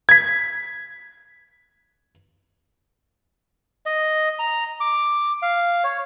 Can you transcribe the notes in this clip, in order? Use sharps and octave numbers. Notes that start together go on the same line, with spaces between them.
G#6 B6
D#5
A#5
D6
F5
C#5